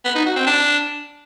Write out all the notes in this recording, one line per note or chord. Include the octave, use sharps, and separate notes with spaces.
B3
D#4
F#4
C4
D4